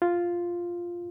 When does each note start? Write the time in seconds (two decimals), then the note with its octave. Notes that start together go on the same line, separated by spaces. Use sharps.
0.02 F4